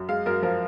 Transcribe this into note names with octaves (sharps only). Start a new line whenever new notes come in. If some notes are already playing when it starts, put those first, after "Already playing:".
Already playing: F#2
G#3 F5
F#2 A#4
F3 A#4